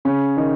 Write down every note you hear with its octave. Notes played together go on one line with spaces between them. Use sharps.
C#3 C#4
D#3 D#4